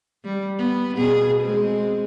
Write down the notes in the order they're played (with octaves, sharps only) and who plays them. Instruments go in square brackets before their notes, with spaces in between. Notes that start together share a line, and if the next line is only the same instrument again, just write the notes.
[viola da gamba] G3
B3
B2 G#4
G#3 C4